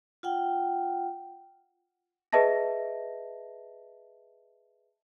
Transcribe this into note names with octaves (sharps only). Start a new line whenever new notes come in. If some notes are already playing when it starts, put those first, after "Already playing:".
F4 F#5 G5
G#4 B4 D#5 E5 A5 A#6